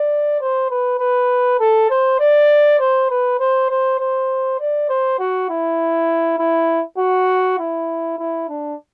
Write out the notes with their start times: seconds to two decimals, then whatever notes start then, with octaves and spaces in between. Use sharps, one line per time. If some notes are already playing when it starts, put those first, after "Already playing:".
Already playing: D5
0.41 C5
0.70 B4
1.00 B4
1.60 A4
1.90 C5
2.20 D5
2.80 C5
3.10 B4
3.40 C5
3.70 C5
3.99 C5
4.60 D5
4.89 C5
5.19 F#4
5.50 E4
6.39 E4
6.99 F#4
7.59 E4
8.19 E4
8.49 D4